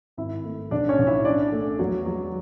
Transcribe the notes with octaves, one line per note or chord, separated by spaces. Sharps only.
G#1 E4 E5
A3
B1 D4 D5
C#4 C#5
B1
E4 E5
A1 D4 D5
A3
E2 F#3 F#4
F#3 G#3 F#4